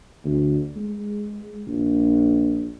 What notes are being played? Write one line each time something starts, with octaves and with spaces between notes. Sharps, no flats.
D2
G#3
A#1